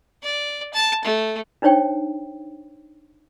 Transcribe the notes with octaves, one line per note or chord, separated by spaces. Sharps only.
D5
A5
A3
D4 D#4 C5 C#5 G5